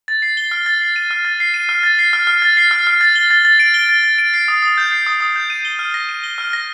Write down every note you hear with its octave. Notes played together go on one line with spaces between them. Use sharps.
A6
C7
G7
F6
A6
C7
D#7
F6
A6
C7
D#7
F6
A6
C7
F6
F6
A6
C7
F6
F6
A6
G7
A6
A6
D7
G7
A6
A6
D7
C7
D#6
D#6
G6
C7
D#6
D#6
G6
D#7
G7
F6
A#6
D#7
G7
F6
A#6